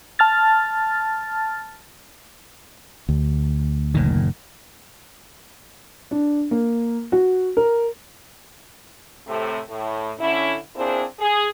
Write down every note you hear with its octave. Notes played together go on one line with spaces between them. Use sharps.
A5 F6 A6
D2
F#1 A#2 D#3
D4
A#3
F#4
A#4
A2 C3 A3
A2
D3 C#4 E4
A#2 C4 D4 E4 G#4 C5
G#4